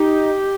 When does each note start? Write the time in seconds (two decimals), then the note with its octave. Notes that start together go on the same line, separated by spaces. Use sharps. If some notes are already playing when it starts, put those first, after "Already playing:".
Already playing: D#4 G4